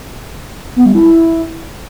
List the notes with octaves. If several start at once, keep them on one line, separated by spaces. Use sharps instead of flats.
B3
G3
E4